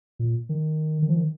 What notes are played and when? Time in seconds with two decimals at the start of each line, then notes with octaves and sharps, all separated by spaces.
0.19 A#2
0.49 D#3
1.02 D#3
1.09 F3
1.16 D#3